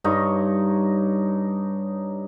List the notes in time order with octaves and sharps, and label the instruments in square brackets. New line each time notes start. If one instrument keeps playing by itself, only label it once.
[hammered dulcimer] G2 D#4 C#5